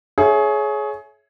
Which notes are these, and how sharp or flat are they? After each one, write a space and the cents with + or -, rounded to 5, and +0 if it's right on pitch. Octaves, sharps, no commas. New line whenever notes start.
G#4 +25 C#5 +0 E5 +0